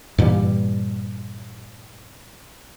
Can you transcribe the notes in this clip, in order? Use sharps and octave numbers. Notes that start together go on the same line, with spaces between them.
G2 A#2 E3 G3